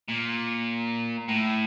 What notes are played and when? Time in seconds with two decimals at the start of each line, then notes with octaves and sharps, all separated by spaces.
0.09 A#2
1.28 A2